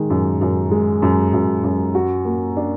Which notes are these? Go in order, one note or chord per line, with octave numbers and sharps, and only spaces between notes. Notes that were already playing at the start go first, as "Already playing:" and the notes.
Already playing: D#3 G#3
F#2
F#2
G#3
F#2
F#2
F#2
F#4
A#3
D4